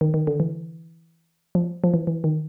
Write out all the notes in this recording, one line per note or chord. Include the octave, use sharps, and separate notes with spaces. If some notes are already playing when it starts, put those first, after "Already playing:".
D#3
D#3
D3
E3
F3
F3
E3
E3
D#3